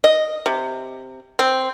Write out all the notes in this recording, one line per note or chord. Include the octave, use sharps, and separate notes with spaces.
D#5
C3
C4